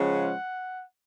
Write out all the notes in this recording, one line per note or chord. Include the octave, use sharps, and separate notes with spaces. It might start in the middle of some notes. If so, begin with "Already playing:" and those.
Already playing: C#3 F3 G#3 C#4 F#5